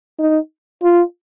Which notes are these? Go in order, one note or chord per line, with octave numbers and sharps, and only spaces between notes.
D#4
F4